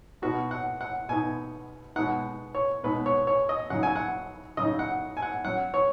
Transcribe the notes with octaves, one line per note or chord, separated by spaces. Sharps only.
B2 B3 D#4 F#4
F#5
F#5
B2 B3 D#4 G#5
B2 G#3 B3 D#4 F#5
C#5
B2 G#3 B3 D#4 B4
C#5
C#5
D#5
C#3 F#3 D#4 F#5
G#5
F#5
C#3 F#3 D#4 D#5
F#5
G#5
F#5
F#3 C#4 F#5
C#5